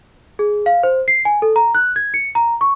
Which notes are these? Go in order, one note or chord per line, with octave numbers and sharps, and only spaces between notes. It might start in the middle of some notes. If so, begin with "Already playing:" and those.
G#4
F5
C5
C7
G#5
A4
A#5
F#6
G#6
C#7
A#5
C#6